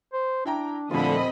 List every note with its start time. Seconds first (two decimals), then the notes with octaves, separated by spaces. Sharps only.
0.13 C5
0.45 D4 E4 G5 A#5
0.91 D#1 A2 D3 F3 C4 F4 D#5 B5